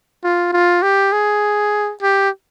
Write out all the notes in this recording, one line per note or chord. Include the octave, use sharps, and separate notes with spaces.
F4
F4
G4
G#4
G4